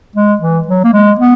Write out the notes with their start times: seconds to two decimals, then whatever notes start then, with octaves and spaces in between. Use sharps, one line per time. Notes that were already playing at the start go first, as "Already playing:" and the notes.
0.16 G#3
0.41 E3
0.67 F#3
0.84 A#3
0.94 G#3
1.19 B3